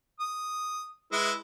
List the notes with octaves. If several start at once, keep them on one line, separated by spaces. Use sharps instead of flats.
D#6
G#3 E4 B4